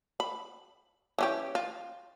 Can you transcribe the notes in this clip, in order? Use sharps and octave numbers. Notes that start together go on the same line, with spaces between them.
B5
E3 C#4 G4
F4